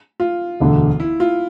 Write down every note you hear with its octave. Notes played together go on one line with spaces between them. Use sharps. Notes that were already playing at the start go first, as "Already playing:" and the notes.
F4
E1 D2 D3 A3
E4
F4